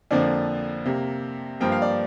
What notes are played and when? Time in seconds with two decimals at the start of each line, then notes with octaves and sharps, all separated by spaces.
0.11 F2 D3 F3 A#3 D5
0.85 C3 A#3
1.61 G2 F3 A#3 G5
1.72 F5
1.82 D5